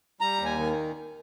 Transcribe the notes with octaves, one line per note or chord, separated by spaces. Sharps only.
G3 A#5
D#2
G#5
D#3